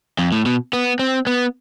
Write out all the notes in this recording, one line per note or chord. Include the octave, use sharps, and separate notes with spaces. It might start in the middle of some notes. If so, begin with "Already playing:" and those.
F2
A2
B2
B3
C4
B3